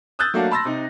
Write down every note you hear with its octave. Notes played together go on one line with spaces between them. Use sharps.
D#6 E6 F#6 G6 A6
F#3 A3 A#3 D4 F#4 F5
A5 B5 C6 E6 A6 A#6
C3 D#4